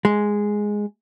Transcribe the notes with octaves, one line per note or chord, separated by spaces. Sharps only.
G#3